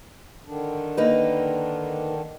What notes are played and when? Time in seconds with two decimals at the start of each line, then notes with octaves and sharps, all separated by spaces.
0.46 D3 D#3 D4
0.97 A#3 D#4 B4